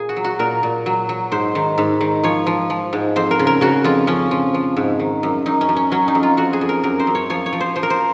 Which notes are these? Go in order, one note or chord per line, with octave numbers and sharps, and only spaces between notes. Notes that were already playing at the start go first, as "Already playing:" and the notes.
Already playing: A#2 G#4
F#4
F#3
F#4
A#2 A#4
A#2
F#3
F#3
G#2 C5
D#3
G#2
D#3
F3 C#5
F3
F3
G#2
F2 C5
A#4
C#3
A#4
C#3 F#4
F2 F4
F3 C#4
F3
F3
G#2
D#3
F#2
F#2 D#4
C#4
F#2
C#4
F#3 C#4
D#4
F2
F4
F2 F#4
G#4
F2
A#4
F#2 A#4
C5
F#2
C#5
F3 C#5
C#5
F3
C5
F3 C5
A#4
C5